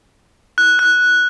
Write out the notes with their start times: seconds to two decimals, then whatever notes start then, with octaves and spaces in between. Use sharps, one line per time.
0.58 F#6
0.79 F#6